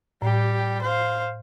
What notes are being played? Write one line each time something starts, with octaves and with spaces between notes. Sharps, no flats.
A2 G3 G4
C5 F5